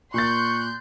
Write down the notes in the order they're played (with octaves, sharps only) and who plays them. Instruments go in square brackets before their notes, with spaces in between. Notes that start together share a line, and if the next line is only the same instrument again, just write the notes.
[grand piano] A#2 A6 [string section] C6 F#6 G6 [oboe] C#6